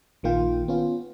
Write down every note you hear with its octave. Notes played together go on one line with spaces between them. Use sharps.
A#1 D#3 A#3 F4 G5
B3 C#4 F4